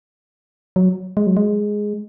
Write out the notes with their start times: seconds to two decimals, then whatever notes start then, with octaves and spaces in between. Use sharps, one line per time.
0.76 F#3
1.17 G#3
1.27 F#3
1.37 G#3